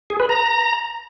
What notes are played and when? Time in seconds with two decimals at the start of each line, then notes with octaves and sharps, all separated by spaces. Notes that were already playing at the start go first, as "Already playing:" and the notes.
0.10 G#4
0.20 B4
0.29 A#5